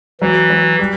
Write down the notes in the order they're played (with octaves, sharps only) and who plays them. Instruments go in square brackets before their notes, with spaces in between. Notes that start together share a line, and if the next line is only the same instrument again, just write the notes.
[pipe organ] E3 [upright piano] F#3
[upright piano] F#3
G3